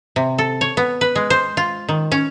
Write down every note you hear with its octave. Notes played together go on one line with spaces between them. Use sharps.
C3
A4
C#5
B3
B4
G#3
C5
F4
D#3
C#4